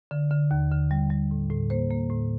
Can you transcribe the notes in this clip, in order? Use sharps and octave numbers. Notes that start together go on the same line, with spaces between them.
D3
D3
D#2
D3
G3
G3
A2
A2
A#3 C5
A#3
A2